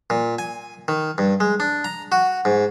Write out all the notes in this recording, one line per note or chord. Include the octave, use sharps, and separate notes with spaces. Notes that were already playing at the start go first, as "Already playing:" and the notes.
A#2
G#5
D#3
G2
G#3
D4
A#5
F#4
G#2